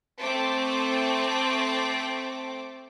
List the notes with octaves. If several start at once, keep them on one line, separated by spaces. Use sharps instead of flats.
A3 C4 C5 G5 A5 D6